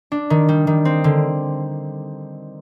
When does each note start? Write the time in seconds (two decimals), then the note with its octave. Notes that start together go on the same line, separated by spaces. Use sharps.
0.12 D4
0.30 D#3
0.49 G3
0.67 D#3
0.85 C4
1.04 D3